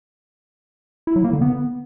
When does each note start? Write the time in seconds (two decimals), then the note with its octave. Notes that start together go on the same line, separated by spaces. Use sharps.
1.07 E4
1.16 F#3
1.24 A#3
1.33 D3
1.41 B3